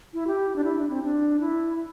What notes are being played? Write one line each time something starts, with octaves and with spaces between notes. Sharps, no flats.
E4
G4
D4
E4
D4
C4
D4
E4